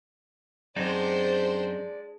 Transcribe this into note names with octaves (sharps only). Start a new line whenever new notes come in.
F#2 G#3 C4 D4 D#4 G4 C5 D5